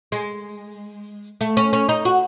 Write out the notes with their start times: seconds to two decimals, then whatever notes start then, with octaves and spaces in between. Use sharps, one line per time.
0.12 G#3
1.41 A3
1.57 C#4
1.73 C#4
1.89 D#4
2.05 F#4